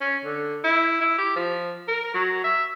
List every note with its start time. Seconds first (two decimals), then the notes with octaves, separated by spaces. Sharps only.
0.01 C#4
0.25 D3
0.64 E4
1.01 E4
1.18 G4
1.36 F3
1.88 A#4
2.14 F#3
2.44 E5